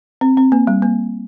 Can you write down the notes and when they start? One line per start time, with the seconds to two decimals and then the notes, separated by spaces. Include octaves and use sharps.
0.21 C4
0.37 C4
0.52 A#3
0.67 G3
0.82 A#3